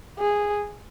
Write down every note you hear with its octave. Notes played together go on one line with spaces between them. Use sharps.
G#4